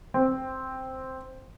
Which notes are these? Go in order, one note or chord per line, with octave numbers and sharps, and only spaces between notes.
C4